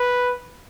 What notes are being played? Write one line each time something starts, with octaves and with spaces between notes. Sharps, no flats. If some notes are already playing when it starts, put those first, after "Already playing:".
Already playing: B4